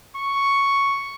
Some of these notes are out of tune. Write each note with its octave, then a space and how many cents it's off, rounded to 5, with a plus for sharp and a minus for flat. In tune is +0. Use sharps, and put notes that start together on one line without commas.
C#6 +0